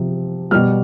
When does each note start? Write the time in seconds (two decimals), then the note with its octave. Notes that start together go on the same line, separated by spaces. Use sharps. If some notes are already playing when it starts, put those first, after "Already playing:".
Already playing: C3 F3
0.51 B2 G3 F6